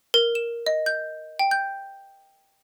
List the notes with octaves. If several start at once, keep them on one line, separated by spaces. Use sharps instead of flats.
A#4
E7
D#5
G6
G5
G6